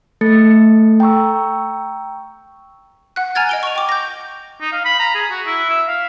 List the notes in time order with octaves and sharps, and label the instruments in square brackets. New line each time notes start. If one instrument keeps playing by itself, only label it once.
[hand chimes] A3 A4 A6 C#7
G5 A#5 C#6 E6
[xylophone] F#5 F#6
G#5 A#5 F6 G#6 A6
D#5 D7 G7
C#6 F7
G5 D6
G6 A#6
[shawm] D#4
F5
B5
A#5
G#4
F#4
E4
E5
F5